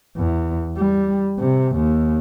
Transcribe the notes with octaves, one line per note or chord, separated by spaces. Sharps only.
E2
G3
C3
D#2